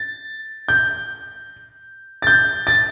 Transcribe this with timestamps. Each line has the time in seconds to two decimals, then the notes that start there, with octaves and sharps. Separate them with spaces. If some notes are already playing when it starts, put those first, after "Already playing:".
Already playing: A6
0.69 G6
2.22 A6
2.27 G6
2.67 A6